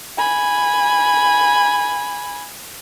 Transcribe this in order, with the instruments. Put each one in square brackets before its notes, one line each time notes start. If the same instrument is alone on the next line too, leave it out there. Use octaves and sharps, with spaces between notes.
[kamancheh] G#5 B5